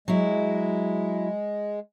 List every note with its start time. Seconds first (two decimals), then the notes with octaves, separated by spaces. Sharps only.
0.08 F#3 G#3 E4